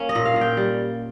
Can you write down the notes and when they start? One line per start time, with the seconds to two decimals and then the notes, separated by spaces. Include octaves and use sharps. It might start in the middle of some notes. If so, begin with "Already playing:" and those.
Already playing: A#3 C#4
0.09 D#5
0.15 A#2
0.25 F5
0.36 A#2
0.41 G5
0.57 G3